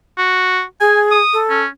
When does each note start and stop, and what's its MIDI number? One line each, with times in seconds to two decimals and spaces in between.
0.18 0.62 66
0.81 1.19 68
0.81 1.00 80
1.11 1.39 87
1.33 1.60 69
1.50 1.67 61